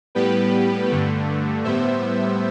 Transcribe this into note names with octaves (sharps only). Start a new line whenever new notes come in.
A2 G3 B3 G4 B4
G2 D3 A3
A2 G3 B3 C5 E5